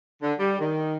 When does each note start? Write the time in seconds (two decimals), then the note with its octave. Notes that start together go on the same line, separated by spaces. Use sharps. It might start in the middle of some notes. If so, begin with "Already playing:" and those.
0.22 D3
0.39 G3
0.59 D#3